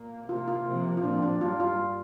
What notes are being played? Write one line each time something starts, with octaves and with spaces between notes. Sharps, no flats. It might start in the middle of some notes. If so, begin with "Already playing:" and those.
Already playing: A#2 A#3
C3 A#3 F4
F4
C3 F3 A#3
F4
A#2 F3 C4 D4
D4
G2 G3 A#3 F4
F4